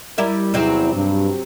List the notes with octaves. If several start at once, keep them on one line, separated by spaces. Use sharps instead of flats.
G3 E4 A#4
E2 C3 F#3 C4 E4
G2